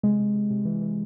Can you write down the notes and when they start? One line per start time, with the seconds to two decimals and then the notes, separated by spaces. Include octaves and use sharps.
0.03 C3 G#3
0.19 C3
0.35 C3
0.50 C3
0.65 E3
0.81 E3